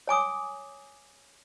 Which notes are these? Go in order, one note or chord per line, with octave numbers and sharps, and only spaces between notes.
C#5 G#5 D6 D#6